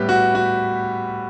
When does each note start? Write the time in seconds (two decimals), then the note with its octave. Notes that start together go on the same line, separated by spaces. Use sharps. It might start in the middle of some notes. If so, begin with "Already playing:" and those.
Already playing: A2 G3 B3 G4 B4
0.09 F#4
0.35 F#4